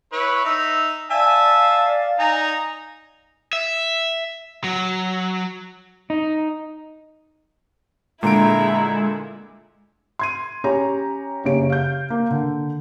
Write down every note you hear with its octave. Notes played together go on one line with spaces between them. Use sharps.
E4 B4 C#5
D#4 E5
D5 E5 F5 G#5 A5
D#4 G#5 A#5
E5
F#3
D#4
A#2 D3 G#3 E4 A#5 D7
C6 G#6 D#7
C#4 G4 C#5 A#5
F#1 C#3 G4 C#5 D7
F5 G6
A#3
D3